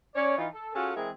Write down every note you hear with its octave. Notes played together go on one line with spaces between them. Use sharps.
C#4 C#5 D5
E3 D#4 F4
A4
C#4 F4 F#4 G#4 A4
E3 G#3 C4 E4 G#4 A#4